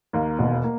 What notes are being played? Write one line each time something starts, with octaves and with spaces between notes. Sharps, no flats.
D#2 A#3
E1 B2 B3
A#3